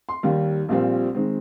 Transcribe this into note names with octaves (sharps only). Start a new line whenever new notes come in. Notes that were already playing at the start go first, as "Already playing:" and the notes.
C6
D#2 D#3 G3
A#1 A#2 G3 C4
D#3 G#3 C4